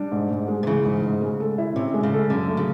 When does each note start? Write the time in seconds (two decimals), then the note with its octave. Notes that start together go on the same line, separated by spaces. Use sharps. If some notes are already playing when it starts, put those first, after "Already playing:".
Already playing: G3 D4
0.12 G#2
0.31 G#2
0.48 G#3
0.63 C3
0.67 C#3 E3
0.85 G#2
1.03 G#2
1.21 G#3
1.40 A4
1.58 E4
1.76 C3 C#4
1.94 G#3
2.03 C#3
2.13 A4
2.30 F#2 D3
2.48 A3
2.57 C#3